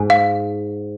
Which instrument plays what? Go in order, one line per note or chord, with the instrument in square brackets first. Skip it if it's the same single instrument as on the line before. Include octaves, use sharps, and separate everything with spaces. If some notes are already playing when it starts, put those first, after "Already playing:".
Already playing: [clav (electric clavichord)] G#2 [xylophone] G#5
[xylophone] F5